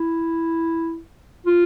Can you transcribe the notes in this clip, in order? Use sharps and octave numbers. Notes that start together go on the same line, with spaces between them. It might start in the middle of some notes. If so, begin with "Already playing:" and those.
Already playing: E4
F4